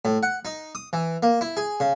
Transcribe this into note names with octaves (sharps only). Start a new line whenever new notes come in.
A2
F#5
D#4
D#6
E3
A#3
E4
G#4
C#3